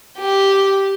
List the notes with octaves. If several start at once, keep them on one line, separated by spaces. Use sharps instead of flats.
G4